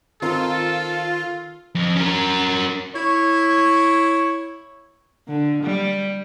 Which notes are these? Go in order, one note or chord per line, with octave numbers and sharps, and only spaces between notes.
D#3 C4 F4 A4 A#4
F2
C#4 A#4
E4 C#5
D3
G3